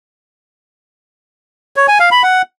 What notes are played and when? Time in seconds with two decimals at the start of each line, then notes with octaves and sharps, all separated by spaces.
1.76 C#5
1.88 G#5
2.00 F5
2.11 B5
2.23 F#5